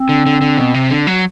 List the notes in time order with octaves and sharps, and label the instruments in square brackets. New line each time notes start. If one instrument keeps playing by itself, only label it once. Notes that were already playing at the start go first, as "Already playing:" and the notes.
Already playing: [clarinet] C4
[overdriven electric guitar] D3
D3
D3
B2
C3
D3
F#3